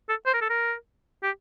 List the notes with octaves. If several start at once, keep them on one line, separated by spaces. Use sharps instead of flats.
A4
C5
A#4
A4
A#4
G4